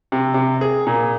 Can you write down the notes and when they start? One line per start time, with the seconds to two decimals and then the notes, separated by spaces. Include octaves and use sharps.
0.12 C3
0.34 C3
0.61 G#4
0.87 A#2